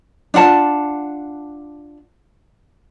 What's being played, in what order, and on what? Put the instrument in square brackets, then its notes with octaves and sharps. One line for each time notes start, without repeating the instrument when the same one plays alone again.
[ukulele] D4 F4 F#5 A5